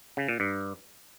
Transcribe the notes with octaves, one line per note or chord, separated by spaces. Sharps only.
C#3
A#2
G2